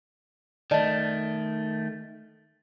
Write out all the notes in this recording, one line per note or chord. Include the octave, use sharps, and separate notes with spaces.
D#3 A3 D5 D#5 A5